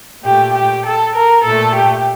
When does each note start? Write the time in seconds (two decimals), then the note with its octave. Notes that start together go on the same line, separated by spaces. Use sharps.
0.23 A#2 A3 G4
0.54 G4
0.84 A4
1.14 A#4
1.44 A#2 A3 A4
1.75 G4